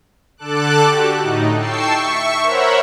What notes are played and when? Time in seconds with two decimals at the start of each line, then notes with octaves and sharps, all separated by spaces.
0.38 D3 A4 A5 D6 F#6
0.84 F#4 G4
1.20 A2 D#4
1.59 G5 A5 C#6 E6 C7
1.93 E5 C#6
2.42 A#4 C5 C#5 E5 F#5 B5